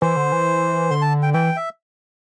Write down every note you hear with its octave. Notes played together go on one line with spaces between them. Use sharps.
E3 C5
D3
E3
D3 C6
A5
G5
E3 G5
E5